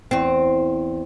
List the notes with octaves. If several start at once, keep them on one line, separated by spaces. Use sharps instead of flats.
E2 C4